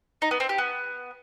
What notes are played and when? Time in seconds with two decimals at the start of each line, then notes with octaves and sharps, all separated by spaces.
0.22 D#4
0.31 B3
0.40 C4
0.49 G4
0.58 B3